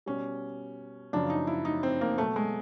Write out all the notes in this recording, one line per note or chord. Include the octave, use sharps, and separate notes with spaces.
B2 G3 C#4
F#2 C#3 F3 D4
D#4
E4
D#4
C4
A#3
B2 F#3 A3
G#3